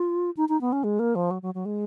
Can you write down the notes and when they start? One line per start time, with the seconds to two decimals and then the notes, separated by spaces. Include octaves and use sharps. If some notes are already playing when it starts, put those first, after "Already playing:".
Already playing: F4
0.37 D#4
0.49 D#4
0.61 B3
0.73 C#4
0.84 G#3
0.99 A#3
1.15 F3
1.31 F#3
1.42 F#3
1.54 F#3
1.65 G#3